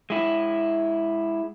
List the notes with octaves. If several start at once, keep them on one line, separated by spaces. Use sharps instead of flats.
G#3 E4